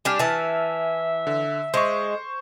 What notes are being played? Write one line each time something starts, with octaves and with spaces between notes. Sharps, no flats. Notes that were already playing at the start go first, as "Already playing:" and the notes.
G3 D4 G#5 F6
E3 E5 G#5 A5
D3
G#3 C5 C#6